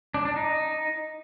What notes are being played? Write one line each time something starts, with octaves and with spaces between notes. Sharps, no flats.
D4
D4
D#4